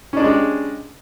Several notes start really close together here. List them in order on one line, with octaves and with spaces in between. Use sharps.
C#4 D4 G4 G#3